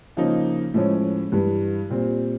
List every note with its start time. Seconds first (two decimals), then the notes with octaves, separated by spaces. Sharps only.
0.17 C#3 F3 A#3 D#4
0.74 A2 F3 G#3 C#4
1.32 G2 E3 G3
1.90 A#2 G3 C4